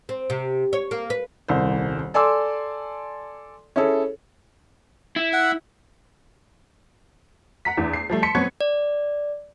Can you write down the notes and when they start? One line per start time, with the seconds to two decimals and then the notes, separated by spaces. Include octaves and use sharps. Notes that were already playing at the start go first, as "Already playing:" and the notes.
0.09 C4
0.30 C3
0.73 C#5
0.91 A#3
1.10 B4
1.48 D#1 C2 C5
2.14 A4 D5 G#5 C6 D6 E6
3.76 C#4 E4 G#4 A4
5.16 E4
5.33 F#5
7.65 F#5 A#5 B6
7.77 E2 E3 D4
7.93 C7
8.10 F3 G3 A3
8.22 A5 C6 B6 C#7
8.35 F#3 B3 C4 B4 C#6 G#6
8.61 D5